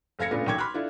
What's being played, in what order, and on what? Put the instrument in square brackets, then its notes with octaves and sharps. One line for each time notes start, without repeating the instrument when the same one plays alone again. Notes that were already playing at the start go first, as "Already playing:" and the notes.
[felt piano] F#1 A4 F5 G#6 A#6 C#7
A#2 C#3 A3 B3 D4 F4
B1 D#3 G5 C#6 D6 G#6
B5 C6 D6 F6 F#6
D4 E4 F4 A4